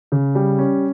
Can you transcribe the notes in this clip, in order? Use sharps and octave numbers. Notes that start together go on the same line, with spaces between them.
C#3
G3
C#4